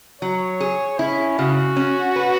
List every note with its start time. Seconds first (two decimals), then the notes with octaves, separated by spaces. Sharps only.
0.22 F#3 C#5
0.60 G#4
0.99 C#4 E4
1.38 C#3 F#4
1.76 C#4
2.16 B4